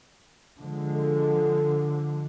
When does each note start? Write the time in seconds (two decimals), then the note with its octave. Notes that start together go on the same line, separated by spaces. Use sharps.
0.58 D3 F3 G#3
0.95 A4